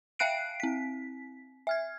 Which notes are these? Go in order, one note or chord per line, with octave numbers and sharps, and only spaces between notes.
E5 F5 G5 F#6 C7 D7
C4 B6
E5 F6 G#6